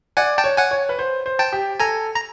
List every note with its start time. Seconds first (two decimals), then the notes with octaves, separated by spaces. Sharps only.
0.17 D5 F#5 G#5
0.38 G5 A5
0.44 C#5
0.57 F#5 G#5
0.71 C#5
0.89 B4
0.99 C5
1.26 C5
1.39 G5 A5
1.53 G4
1.79 A4 G#5 A#5
2.16 A#5